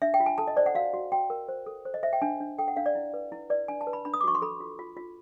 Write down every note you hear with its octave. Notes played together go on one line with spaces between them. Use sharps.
D4 E5
G5
F4
G#5
A4 A5
D#5
C5 D5
F#5
F#4 F5
F#4
F#4 G5
A#4
C5
A4
C5
D#5
C5 E5
G5
D4 G#5
D4
A4 G5
F#5
D4 F5
D5
E4
B4
E4
B4 D5
D4 G#5
A5
B4
B5
D4 B5
D#6
D6
F#4 C#6
C6
A4 B5
F4
F4
F4